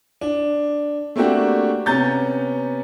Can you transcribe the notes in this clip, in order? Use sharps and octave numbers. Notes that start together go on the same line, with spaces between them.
D4
A3 A#3 C4 D4 F#4 G4
C3 B3 C#4 A#5 G6 A6